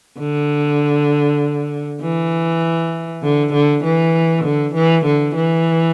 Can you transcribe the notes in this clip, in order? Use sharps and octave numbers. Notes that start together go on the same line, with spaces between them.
D3
E3
D3
D3
E3
D3
E3
D3
E3